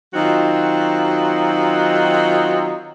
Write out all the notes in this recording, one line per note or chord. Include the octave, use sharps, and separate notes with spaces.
D#3 F#3 C4 D#4 F4 F#4